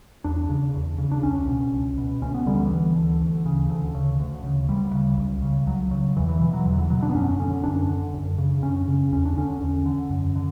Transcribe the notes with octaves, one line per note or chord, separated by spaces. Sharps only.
E2 D4
C#3
E2
C#3
D4
C#2 C#4
B2
C#2
B2
D2 C#4
B3
D3 G3
E3
D2
D3
D2
C#3
D2 D3
C#3
D2
C#3
D2 G3
C#3
C#2
C#3
C#2 F#3
C#3
E2 E3
E3
B2 E3
F#3
E2 D3
E3
B2 F#3
D4
B3
F#2 C#4
D3 C#4
F#2 D4
D3
F#2
C#3
F#2 C#4
C#3
E2 C#4
D4
D3 C#4
E2
D3
F#2
D3